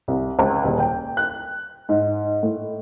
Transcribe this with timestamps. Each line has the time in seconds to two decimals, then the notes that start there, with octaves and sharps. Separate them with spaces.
0.08 C2
0.39 C#2
0.64 D#1
0.80 G5
1.17 F#6
1.89 G#2
2.43 A2